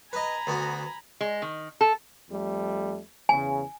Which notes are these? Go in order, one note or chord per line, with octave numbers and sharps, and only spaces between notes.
B4 D#5 G#5 A#5 B5
D2 B3 F#4
G#3
D#3
A4
F2 G3 A3
E2 C#3 G#5